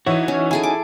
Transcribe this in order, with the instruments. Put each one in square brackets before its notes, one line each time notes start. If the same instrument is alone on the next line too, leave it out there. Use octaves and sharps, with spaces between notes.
[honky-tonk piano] E3 E4 C#5 [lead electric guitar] D#4 F#4
[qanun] C#4
[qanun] E4 G#4 A4 [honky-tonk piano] G#5
[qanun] D6